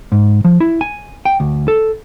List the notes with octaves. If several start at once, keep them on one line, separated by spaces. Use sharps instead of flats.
G#2
F3
E4
G#5
G5
D2
A4